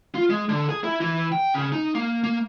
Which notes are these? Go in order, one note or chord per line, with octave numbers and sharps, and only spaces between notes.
F4
G#3
D3
G#4
E4
E3
G5
C#3
D#4
A#3
A#3